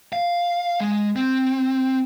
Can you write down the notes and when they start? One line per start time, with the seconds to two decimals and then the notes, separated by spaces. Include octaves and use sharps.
0.13 F5
0.80 G#3
1.16 C4